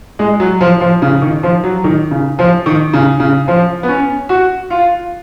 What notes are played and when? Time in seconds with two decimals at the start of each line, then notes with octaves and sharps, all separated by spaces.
0.19 G#3
0.40 F#3
0.61 F3
0.81 F3
1.02 C#3
1.22 D#3
1.43 F3
1.64 F#3
1.84 D#3
2.11 C#3
2.39 F3
2.66 D#3
2.93 C#3
3.20 C#3
3.48 F3
3.83 B3
3.88 C#4
4.29 F#4
4.70 F4